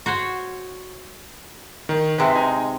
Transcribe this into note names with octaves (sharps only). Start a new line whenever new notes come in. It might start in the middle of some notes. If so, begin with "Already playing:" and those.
F#4 C5 C#5
D#3
C3 G#3 B4 E5
D#4 G#5